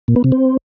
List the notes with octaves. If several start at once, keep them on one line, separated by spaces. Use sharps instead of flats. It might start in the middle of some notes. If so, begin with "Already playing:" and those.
A#2
B3
C3
C4